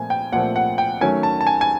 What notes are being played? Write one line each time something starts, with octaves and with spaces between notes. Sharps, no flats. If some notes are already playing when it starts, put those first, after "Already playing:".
Already playing: A#2 F3 A3 C4 G#5
G5
A#2 F3 A3 C4 F#5
F#5
G5
D#3 F#3 A3 C#4 G#5
A5
A5
G#5
G#5